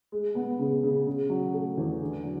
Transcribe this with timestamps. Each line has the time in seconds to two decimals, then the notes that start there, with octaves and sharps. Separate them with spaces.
0.12 G#3
0.35 B3
0.59 C#3
0.84 C#3
1.07 C#3
1.30 F#3
1.54 A3
1.78 E2
2.01 D3
2.25 F#3